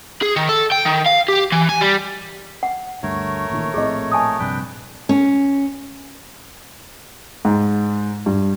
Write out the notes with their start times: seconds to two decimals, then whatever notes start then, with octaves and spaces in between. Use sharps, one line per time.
0.22 G#4
0.36 D#3
0.49 A4
0.72 G5
0.86 D#3
1.06 F5
1.29 G4
1.52 E3
1.69 G#5
1.81 G3
2.63 F#5
3.03 D2 G2 A3 A#4 C#5
3.50 A1 A#2 D#3
3.74 A#1 A2 C4 G#4 D#5
4.12 G#5 A5 D#6
4.39 A#1 G2 C3 D4 B4 G5
5.09 C#4
7.45 G#2
8.26 G2